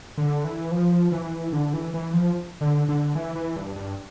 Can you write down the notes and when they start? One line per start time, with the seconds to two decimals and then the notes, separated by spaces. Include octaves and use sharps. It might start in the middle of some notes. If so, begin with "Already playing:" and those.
0.18 D3
0.44 E3
0.71 F3
1.12 E3
1.53 D3
1.74 E3
1.94 E3
2.13 F3
2.61 D3
2.89 D3
3.15 E3
3.35 E3
3.56 G2
3.76 G2